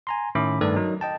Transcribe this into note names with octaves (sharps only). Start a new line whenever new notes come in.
G#5 A#5 C6
A2 D#3 C#4 E5 B5 D6
G2 D#3 A3 A4 B4 D5
F#3 D#4 A#4
D#5 G5 A5